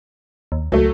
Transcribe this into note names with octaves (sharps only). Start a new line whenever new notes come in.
D#2
C#2 F#3 A3